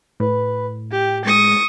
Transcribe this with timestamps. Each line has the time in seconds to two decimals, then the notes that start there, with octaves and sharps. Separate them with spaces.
0.20 A2 B4
0.92 G4 G5
1.25 G#3 C#6 D#6